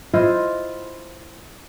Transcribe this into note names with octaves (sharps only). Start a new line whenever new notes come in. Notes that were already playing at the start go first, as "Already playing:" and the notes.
E4 F4 C5 D#5